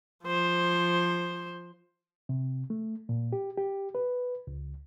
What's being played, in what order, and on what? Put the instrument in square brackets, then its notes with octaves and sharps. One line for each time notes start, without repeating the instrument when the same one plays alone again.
[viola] F3 C5
[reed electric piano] C3
A3
A#2
G4
G4
B4
C#2